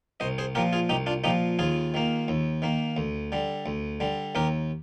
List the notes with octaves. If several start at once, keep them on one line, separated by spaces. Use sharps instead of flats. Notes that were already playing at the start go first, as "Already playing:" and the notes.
C2 C5 D#5
G#4 C5
A#2 F3 G4 A#4
F4 G#4
C2 D#4 G4
D4 F4
A#2 F3 D#4 G4
D#2 F4 G#4
D#3 A#3
D#2
D#3 A#3
D2
D3 G3
D2
D3 G3
D#2 G4 A#4